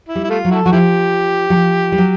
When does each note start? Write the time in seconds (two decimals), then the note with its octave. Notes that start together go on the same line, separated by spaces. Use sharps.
0.09 E4
0.15 G3
0.24 E4
0.30 A3 F4
0.45 F#3
0.51 E4 F#4 A4
0.66 F#3 F#4
0.72 F3 E4 G4
1.50 F#3
1.56 F3
1.92 G3
1.98 F#3